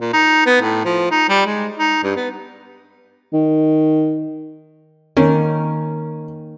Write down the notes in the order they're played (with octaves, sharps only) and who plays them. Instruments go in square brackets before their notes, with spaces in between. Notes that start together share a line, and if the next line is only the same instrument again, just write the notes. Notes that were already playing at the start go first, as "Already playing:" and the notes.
[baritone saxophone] A#2
D#4
B3
A2
F3
D#4
G3
G#3
D#4
G2
B3
[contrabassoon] D#3
[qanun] D#3 A#3 [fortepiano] C#4